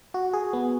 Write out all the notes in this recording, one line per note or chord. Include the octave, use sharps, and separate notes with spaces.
F#4
G#4
B3